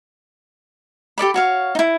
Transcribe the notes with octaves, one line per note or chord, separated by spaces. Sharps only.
G4 A4 D5 B5
F#4 C#5 F5
D#4 E4